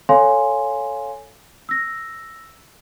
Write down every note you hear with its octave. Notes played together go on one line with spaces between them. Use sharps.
A4 C#5 F5 G#5 C6
E6 A#6